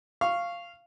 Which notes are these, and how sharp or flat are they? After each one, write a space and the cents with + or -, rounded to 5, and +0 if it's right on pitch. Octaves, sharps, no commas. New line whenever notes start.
F5 -10 C#6 -5